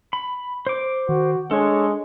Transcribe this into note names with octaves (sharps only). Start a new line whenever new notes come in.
B5
C5 D6
D#3 F#4
G#3 D4 A4 C#5